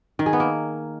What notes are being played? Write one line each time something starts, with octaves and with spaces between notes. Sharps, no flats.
D#3
G#4
B3
A#3